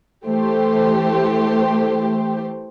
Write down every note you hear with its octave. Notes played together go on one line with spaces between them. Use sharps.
E3 A3 G4 C5